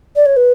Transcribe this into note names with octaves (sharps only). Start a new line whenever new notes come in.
D5
C#5
B4